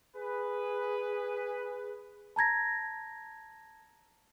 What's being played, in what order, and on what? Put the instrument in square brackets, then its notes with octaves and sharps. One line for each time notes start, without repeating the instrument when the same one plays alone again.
[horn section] G#4 B4
[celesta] A5 A#5 G#6 A#6